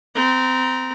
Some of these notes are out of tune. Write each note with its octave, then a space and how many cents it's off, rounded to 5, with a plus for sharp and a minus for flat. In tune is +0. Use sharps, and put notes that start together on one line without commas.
C4 -25 A#5 +15